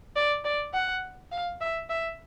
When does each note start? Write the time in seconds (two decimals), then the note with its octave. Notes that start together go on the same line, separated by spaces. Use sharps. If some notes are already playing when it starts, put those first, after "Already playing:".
0.16 D5
0.45 D5
0.73 F#5
1.32 F5
1.61 E5
1.90 E5